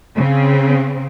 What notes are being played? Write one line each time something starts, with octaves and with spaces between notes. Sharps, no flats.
C#3 C4